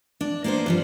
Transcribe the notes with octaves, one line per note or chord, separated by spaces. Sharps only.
D4
A#3 B3 D4 G#4 C5
G2 F3 G3